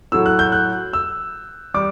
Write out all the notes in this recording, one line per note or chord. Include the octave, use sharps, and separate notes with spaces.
A2 F#3 A3 E6
F#6
G6
F#6
E6
G3 D6